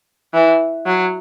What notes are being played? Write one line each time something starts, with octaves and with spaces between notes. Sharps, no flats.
E3
F#3